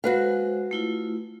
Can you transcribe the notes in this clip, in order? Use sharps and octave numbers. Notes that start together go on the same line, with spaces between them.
G#3 F#4 B4 C5 F5
A3 E4 F4